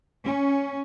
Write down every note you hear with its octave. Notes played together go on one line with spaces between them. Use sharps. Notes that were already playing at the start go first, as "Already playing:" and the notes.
C#4